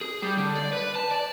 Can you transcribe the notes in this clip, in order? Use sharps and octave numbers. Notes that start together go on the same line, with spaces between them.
G#4
G3
D3
D5
B4
A5
D5